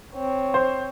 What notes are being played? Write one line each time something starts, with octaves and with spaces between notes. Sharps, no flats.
C4 C#5
C5